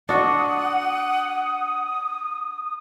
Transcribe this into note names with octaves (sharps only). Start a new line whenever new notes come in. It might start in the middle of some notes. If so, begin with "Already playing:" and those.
D4 F#4 F#5 D#6